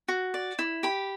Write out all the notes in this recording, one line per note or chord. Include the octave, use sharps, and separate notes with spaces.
F#4
D5
E4
G4 B5